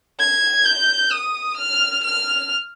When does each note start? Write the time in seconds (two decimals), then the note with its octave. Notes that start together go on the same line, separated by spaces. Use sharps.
0.20 G#6
0.65 G6
1.11 D#6
1.56 F6
2.03 F6